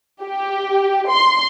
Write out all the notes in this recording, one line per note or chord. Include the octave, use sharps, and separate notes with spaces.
G4
C6